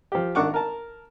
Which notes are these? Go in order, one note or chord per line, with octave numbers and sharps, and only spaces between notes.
F3 G4
G#1 D4 F#5 C#6 D6
A#4 A5